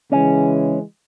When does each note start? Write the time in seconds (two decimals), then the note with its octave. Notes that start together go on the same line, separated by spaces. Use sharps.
0.12 C#3 E3 G#3 C#4